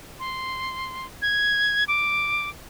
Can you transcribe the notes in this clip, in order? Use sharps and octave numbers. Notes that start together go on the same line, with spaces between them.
C6
G#6
D6